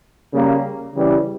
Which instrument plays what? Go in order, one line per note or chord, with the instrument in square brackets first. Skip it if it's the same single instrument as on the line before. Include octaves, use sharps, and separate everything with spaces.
[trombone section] C#3 G3 A#3
C#3 E3 G3